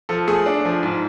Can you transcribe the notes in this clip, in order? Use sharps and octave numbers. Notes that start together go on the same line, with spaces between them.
F3 A4
A3 G#4
D4
F3
G#2